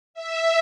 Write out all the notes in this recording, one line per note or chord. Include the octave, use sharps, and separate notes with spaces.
E5